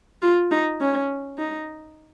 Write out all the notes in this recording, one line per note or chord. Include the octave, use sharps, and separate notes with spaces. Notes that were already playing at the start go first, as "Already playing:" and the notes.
F4
D#4
C#4
D#4